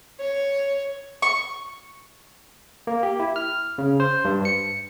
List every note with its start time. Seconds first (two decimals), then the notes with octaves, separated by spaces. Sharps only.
0.20 C#5
1.22 C#6
2.87 A#3
3.03 G4
3.20 E4
3.36 F6
3.78 C#3
4.00 C5
4.25 G2
4.45 C#7